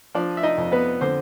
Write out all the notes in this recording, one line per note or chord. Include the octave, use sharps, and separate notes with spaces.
F3 D4 D5
E5
D#4 D#5
F2
B3 B4
D3 C4 C5